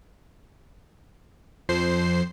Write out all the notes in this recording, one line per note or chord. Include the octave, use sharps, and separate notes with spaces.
F2 F3 C5 C7